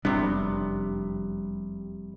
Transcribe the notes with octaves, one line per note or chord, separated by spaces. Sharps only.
F1 F#2 C3 G3 B3 D4